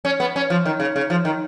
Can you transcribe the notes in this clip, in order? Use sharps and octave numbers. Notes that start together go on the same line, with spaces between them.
C#4
B3
C#4
F3
D#3
C#3
C#3
F3
D#3